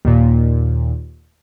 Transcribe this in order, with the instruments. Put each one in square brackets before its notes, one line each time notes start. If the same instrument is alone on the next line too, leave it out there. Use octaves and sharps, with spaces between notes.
[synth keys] D#2 A#2